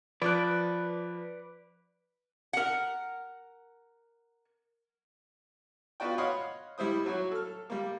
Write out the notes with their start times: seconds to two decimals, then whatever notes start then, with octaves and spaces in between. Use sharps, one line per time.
0.22 F3 B4 D5 F#6
2.53 A#4 F#5
6.00 B3 F4 F#4 D5 G5
6.18 C#5 D#5 F5 F#5 B5 C6
6.78 G3 E4 C5 D#6
7.06 F#3 F#4 C#5
7.32 A4 F6
7.70 G3 A#3